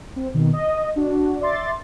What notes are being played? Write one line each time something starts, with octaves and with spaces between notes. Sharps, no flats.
C4
B2 D#3
D#5
D4 F#4
D5 E5 C6 A6